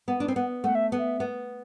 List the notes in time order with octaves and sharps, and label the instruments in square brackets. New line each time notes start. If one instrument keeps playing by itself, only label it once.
[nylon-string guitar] B3 [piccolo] F#5
[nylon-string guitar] D4
C4
[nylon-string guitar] B3 [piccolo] F#5
[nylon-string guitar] A3 [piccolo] F#5
[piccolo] E5
[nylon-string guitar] B3
[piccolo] E5
[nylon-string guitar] B3